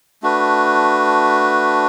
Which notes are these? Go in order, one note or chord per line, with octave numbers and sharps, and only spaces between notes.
A3 D4 F#4 B4